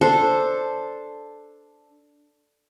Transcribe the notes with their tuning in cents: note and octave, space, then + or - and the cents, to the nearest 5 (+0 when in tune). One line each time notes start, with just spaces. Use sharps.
D4 +0 A4 +0 C5 +0